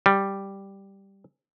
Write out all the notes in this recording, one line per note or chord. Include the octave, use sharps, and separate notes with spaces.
G3